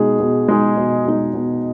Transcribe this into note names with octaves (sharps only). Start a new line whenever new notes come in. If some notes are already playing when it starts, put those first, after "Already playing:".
Already playing: B2 G#3 D#4 G#4
B2
G#3 D#4 G#4
B2
G#3 D#4 G#4
B2